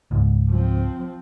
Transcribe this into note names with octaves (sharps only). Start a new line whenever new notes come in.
C#2 G#2
F3 C4